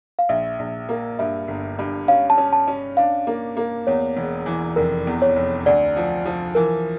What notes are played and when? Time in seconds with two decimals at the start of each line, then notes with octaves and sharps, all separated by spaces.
0.19 F5
0.29 A#1 E5
0.59 A#1
0.89 A#3
1.19 G2 E5
1.48 G1
1.79 G2
2.08 C#4 F5
2.30 A5
2.38 C#4
2.53 A5
2.68 C#4
2.97 D4 F5
3.27 A#3
3.57 A#3
3.87 E2 C#5
4.17 E1
4.46 E3
4.76 F1 A#4
5.07 E2
5.22 C#5
5.36 F1
5.66 D2 D5
5.96 F3
6.25 F3
6.55 E3 A#4